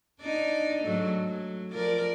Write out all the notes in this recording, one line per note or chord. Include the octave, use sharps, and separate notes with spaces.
D4 D#4 D5
G#2 F#3 A3
F#3
F3 A#4 D5